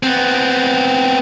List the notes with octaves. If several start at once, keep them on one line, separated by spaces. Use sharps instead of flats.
B3 C4